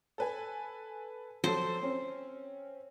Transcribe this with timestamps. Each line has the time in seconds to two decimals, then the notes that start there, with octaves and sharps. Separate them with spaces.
0.18 A4 B4 G#5
1.44 F3 F#3 A4 C5
1.82 C4 C#4